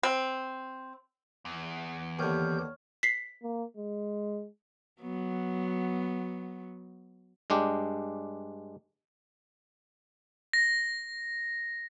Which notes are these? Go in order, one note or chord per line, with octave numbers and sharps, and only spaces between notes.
C4
E2
D#2 D3 E3 G4 C#5 F6 G6 G#6
B6 C7
A#3
G#3
F#3 B3
G2 G#3 D4 G4
A#6